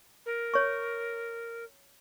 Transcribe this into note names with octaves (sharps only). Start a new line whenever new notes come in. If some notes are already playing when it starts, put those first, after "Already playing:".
A#4
C#5 C#6